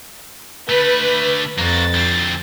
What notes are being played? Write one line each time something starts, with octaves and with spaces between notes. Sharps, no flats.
D3 A3 B4
F2 A#3 F#4 A6
D2 C4